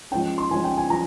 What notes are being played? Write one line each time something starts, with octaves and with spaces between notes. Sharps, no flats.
F3 G#3 C#4 G5
C6
F3 G#3 C#4 G#5
G5
G#5
F3 A#5